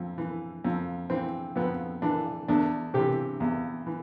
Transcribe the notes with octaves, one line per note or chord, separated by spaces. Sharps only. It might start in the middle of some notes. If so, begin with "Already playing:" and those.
Already playing: F2
E3
F2
E3 C4
F2 B3
E3 D4
E2 D4
C3 E3 G4
E2
E3